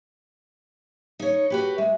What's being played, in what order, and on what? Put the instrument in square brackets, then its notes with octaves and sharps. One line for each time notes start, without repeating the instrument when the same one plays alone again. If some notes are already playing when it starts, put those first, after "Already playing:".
[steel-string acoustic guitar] D#4 C#5
F#4 G4 B4
[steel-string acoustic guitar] G#3 [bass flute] E5